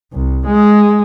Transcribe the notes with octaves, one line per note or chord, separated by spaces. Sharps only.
C2
G#3